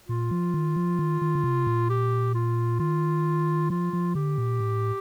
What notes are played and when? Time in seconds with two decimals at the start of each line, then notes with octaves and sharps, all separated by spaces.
0.08 A#2 F4
0.31 F3
0.54 D#3
0.76 F3
0.99 D#3
1.22 D#3
1.35 D3
1.44 C3
1.67 A#2
1.89 G4
2.34 F4
2.79 D#3 F4
3.70 F3 F4
3.93 F3
4.15 D3 G4
4.38 A#2
4.60 A2